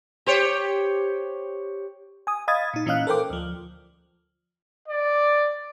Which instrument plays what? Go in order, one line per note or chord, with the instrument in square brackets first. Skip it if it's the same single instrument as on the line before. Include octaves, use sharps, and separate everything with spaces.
[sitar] G4 C5 C#5
[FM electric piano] G#5 D#6
D#5 F5 B5 D#6 G#6 A6
A#2 D#4
A#2 E3 C#4 D#5 F5 F#6
A4 A#4 C5 G5 D6
D2 F3
[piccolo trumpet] D5